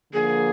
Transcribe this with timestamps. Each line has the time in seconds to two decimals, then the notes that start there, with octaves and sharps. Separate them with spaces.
0.13 D3 F3 A#3 G#4